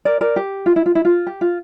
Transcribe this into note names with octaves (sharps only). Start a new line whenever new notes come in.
A#4 D5
A#4 D5
G4
F4
E4
F4
E4
F4
G4
F4